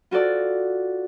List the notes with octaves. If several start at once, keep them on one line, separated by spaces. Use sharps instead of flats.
F4 F#4 A4 D5